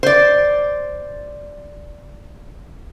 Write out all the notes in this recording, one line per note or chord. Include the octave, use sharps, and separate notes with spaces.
C5 D5